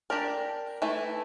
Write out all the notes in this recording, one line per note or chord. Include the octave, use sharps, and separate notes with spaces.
D4 G4 A#4 D5
E3 A3 E4